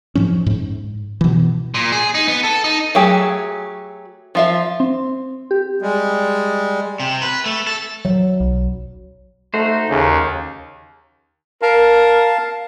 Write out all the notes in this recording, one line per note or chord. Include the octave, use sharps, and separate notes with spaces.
G#2 F3 C#4
G#2
B2 E3
A#2
G#4
D#4
B3
A4
D#4
F#3 A3 G4 G#4
F3 F4 E5
C4
G4
G3 G#3
C3
B4
A3
A4
F#3
B1
A3 D#4 F#4 C5
D#2 C#3
A#4 F5 A5